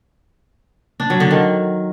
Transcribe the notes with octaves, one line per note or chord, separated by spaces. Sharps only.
D4
F#3
D3
D#3